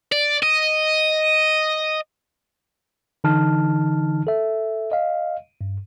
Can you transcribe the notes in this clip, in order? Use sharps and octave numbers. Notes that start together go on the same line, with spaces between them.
D5
D#5
D3 E3 D#4 A5 F6
A4 E5
D#5 F5
G2